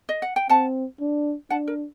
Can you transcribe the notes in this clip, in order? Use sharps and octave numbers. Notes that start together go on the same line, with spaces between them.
D#5
F#5
G5
C4 F#5 A5
D4
D4 F#5 A5
A#4